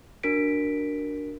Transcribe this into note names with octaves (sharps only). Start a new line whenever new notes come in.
D4 F#4 A#4 B6 D7